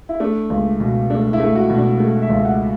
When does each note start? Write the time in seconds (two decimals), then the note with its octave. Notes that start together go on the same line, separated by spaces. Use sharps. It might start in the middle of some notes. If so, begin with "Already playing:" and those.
0.09 E4
0.20 A3 D4
0.50 C#2
0.80 B2
1.10 A3 D4
1.33 E4
1.40 A3
1.55 F#4
1.70 B2
1.78 D4
2.00 A3
2.22 E5
2.30 C#2
2.45 F#5